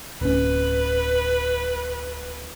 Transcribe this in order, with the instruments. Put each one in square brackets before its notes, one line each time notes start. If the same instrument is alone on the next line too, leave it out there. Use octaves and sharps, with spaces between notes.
[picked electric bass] D1 C#4 [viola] B4